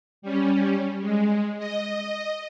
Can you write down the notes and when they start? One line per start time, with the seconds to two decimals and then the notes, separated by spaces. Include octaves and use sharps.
0.22 G3 C#4
1.00 G#3
1.58 D#5